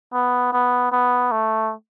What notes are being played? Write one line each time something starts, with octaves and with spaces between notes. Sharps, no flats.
B3
B3
B3
A3